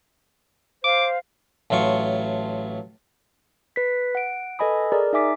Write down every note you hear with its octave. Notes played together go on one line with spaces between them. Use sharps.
C5 F5 D6
A1 A2 F#3 F4 C#6
B4 B6
F#5 D7
A4 B4 D#5 G#5 B5 D#6
G#4 A#4 D5 A#5
D#4 E5 G#5 D6 B6